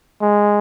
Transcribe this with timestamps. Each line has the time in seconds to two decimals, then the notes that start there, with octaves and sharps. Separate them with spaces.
0.22 G#3